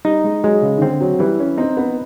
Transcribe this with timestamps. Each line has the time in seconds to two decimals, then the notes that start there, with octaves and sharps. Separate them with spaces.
0.05 G3 D#4
0.24 G#3
0.43 F#3 G#3
0.62 C#3
0.78 D#3
0.81 D3 C4
1.01 F#3
1.19 E3 G3
1.39 C#4
1.58 C4 D#4
1.77 B3